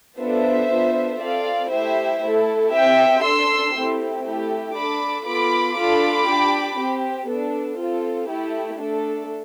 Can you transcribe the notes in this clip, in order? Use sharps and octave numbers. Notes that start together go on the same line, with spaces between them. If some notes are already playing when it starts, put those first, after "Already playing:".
B3 D4 F4 A4 C5 E5
B3 D4 F4 A4
C4 F4 A4 D5 F5
A3 E4 G4 C5 E5
A3 E4 A4
C4 G4 E5 G5
D4 A4 C6 E6
A3 C4 E4 G4
A3 E4 G4
D4 A4 B5 D6
B3 F4 A4 B5 D6
D4 F4 A4 B5 D6
D4 G4
C4 G4
B3 D4 A4
C4 F4 A4
A3 E4 G4
A3 D4 A4